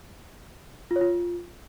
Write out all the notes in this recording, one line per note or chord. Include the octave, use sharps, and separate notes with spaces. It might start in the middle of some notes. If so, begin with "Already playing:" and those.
F4
C#5
F4